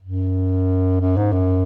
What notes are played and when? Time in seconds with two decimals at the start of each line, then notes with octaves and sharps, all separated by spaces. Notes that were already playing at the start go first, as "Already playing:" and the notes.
0.02 F#2
1.00 F#2
1.17 G#2
1.32 F#2